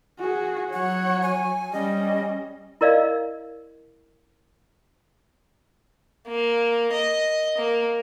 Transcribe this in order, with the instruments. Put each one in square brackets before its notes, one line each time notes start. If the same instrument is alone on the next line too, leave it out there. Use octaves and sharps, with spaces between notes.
[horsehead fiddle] F#4 G#4
[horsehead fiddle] F#3 C#5 [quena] F#5
[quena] G#5
[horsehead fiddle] G3 C#4 [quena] D#5
[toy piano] E4 A#4 D5 D#5 F5
[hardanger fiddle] A#3
D#5
A#3